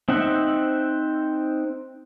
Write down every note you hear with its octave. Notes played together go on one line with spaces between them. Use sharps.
C4 D#4 E5 F#5